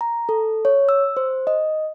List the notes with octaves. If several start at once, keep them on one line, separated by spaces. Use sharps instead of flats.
A#5
A4
C#5
E6
C5
D#5